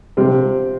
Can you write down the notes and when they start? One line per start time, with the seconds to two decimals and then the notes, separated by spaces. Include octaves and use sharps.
0.17 C3 F3 C4